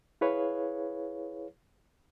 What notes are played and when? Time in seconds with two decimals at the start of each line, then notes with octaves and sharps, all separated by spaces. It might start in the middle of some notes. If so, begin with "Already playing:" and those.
0.21 E4 G#4 B4 C#5 F5